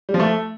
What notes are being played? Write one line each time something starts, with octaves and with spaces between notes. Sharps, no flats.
G3
F3
A3